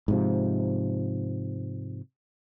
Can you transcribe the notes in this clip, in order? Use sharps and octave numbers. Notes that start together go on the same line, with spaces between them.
G#2 C3 F3